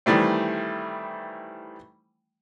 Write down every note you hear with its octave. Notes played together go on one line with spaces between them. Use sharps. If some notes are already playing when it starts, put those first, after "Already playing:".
D#3 E3 G3 A3 C4